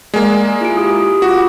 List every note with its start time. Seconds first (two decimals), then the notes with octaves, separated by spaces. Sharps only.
0.14 G#3 A#3 D5 G#5
0.61 E4 F4 D7
0.77 G4 D#6
1.22 F4 F#4 D6